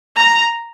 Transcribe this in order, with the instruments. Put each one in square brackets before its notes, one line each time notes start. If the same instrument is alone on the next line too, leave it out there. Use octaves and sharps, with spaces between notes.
[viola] A#5